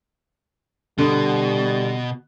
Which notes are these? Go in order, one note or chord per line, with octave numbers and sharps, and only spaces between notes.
B2 D3 G3